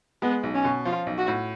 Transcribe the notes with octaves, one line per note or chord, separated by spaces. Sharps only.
G#3 B3
B1
C#4
B2
F3 F4
B1
F#4
A2